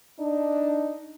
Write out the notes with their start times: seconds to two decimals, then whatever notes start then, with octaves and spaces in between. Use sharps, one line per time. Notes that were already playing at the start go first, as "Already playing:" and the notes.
0.19 D4 D#4